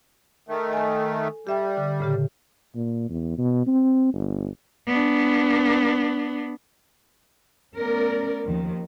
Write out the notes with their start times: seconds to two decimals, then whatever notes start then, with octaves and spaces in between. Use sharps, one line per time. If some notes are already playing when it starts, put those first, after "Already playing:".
0.48 D#3 A3
0.73 A4 G#5
1.47 G3 G4 E5 G5
1.77 D3
2.00 A2 C#3 G4
2.75 A#2
3.09 E2
3.38 B2
3.67 C4
4.14 G1
4.87 B3 D4
7.76 A3 B3 C#4 A#4 D5
8.43 D#2 D#3 F3